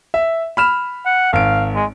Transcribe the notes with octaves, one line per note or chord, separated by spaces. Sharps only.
E5
B5 F6 E7
F#5
G#1 F5 D7
G#3